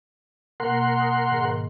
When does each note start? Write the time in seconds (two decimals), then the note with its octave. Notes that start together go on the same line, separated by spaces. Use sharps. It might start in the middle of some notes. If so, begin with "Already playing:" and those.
0.60 B2 A#3 A#4 F#5 C6
0.99 G#5 D#6
1.29 G#2 D#3 G#4